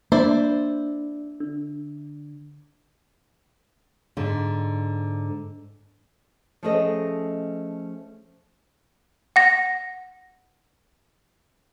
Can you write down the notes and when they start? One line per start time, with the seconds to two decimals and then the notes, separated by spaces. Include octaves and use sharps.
0.12 A#3 D4 E4 C5 D5
1.40 D3
4.17 G#2 D3
6.63 F3 A3 C#4 G#4 A4 D#5
9.36 F#5 A#6